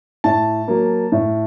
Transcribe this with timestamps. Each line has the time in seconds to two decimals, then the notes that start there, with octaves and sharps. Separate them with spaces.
0.24 A2 A5
0.68 F#3 A#3
1.12 A2